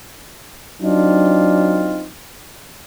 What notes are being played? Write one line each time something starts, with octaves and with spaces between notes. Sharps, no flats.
F#3 C4 D4 D#4 F4